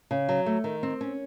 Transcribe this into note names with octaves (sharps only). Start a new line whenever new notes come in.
C#3
F#3
A3
D#3
C4
C#4